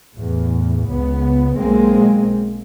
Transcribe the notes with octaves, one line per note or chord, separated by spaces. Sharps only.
E2 A2
C#2 B3
B1 G#3 A#3 C4